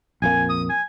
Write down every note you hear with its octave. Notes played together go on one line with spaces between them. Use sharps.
A#1 F2 A#3 G#5
D#6
G#5